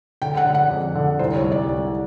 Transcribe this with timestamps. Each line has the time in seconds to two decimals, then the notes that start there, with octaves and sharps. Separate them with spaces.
0.22 D3 G5
0.37 F#5
0.46 D3
0.54 F#5
0.71 F2
0.95 D3
1.19 C2 C5
1.36 C#5
1.43 C2
1.52 D5
1.69 C2